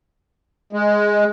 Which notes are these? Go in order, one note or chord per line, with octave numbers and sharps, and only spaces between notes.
G#3